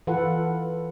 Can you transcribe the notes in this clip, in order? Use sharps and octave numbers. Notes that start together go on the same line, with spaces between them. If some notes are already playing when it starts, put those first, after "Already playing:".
E3 F4 A4 B4 F#5